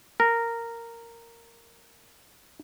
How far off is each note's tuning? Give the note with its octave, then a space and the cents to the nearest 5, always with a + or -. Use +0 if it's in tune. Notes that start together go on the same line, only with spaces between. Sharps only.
A#4 -10